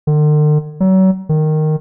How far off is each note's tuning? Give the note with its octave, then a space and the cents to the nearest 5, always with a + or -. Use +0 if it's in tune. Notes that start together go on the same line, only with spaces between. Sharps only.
D3 +45
F#3 +35
D#3 -10